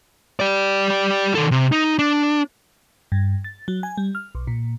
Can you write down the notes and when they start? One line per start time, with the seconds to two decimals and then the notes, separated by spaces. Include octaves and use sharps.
0.40 G4 D5
1.35 D#3 A4
1.51 C3
1.72 D#4
1.99 D4
3.12 G2
3.44 A6
3.68 F#3
3.83 G#5
3.97 G3
4.15 F6
4.35 B1
4.47 A#2